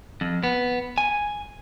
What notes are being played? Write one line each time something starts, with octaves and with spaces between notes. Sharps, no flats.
F2
B3
G#5